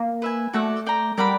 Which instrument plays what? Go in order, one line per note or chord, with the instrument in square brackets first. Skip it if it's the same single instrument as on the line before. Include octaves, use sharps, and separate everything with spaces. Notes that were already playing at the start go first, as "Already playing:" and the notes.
Already playing: [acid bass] A#3
[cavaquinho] B4 E5 G#5
[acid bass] A3 [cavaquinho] F#4 A4 D5 F#5
[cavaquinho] D5 G5 A#5
[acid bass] G3 [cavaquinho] A#4 D5 F#5 B5